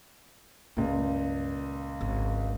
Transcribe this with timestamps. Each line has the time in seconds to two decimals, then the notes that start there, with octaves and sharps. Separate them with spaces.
0.77 C#2 G2 A#2
2.01 G#1